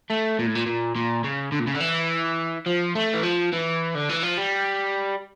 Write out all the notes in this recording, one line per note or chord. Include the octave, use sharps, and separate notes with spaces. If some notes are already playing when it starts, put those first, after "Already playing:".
A3
A#2
A2
A#2
A#2
A#2
C#3
D3
A#2
C#3
D3
E3
F3
A3
E3
F3
E3
D3
E3
F3
G3